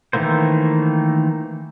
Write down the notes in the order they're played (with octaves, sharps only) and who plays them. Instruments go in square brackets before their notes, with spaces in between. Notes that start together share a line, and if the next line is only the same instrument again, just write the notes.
[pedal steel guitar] D#3 E3 A3 A#3 C5